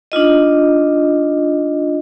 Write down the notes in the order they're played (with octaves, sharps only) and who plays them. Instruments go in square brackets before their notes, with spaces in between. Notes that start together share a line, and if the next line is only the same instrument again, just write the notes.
[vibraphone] D4 D#4 F4 D#5